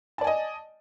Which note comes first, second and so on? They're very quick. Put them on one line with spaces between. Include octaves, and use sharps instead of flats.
A5 D5 G#5 D#5